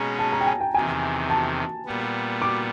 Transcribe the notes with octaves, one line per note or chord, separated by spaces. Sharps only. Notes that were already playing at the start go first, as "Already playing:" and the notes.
Already playing: B2 G#3 C#4 A#5
A5
A#5
G5
G#5
G5
E2 C3 D#3 G#5
A5
A#2 G3 B3
D6